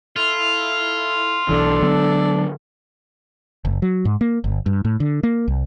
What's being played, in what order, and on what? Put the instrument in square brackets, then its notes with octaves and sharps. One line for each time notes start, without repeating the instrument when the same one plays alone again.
[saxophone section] E4 A4 [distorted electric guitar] F4
[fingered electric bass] B1 E3 [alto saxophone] D4 [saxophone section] A4
[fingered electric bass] D3 F#3 B3
[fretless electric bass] F#1
F#3
G#2
A#3
G1
G2
A2
D3
A#3
C2